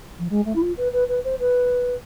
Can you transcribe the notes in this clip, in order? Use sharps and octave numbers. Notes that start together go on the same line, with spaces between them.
F3
G#3
A3
E4
F4
B4
B4
B4
C5
B4